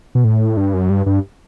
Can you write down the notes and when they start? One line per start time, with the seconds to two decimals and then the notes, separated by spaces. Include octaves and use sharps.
0.15 B2
0.24 A2
0.57 G2
0.74 F#2
0.90 G2
1.06 G2